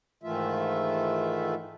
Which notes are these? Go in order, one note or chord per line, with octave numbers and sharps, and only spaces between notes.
G#2 D#3 E3 A3 F4 E5